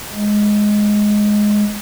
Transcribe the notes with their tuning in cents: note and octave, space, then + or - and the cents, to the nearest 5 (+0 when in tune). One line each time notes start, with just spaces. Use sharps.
G#3 +5